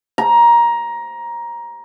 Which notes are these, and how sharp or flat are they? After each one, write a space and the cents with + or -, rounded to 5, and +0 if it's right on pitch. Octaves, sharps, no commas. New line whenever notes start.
A#5 +15